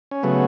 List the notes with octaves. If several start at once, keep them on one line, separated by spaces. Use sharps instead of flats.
C#4
C#3 F#3 A3 B3